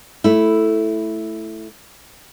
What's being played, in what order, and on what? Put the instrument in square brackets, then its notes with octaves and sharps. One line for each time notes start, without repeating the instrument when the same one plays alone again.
[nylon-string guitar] A3 E4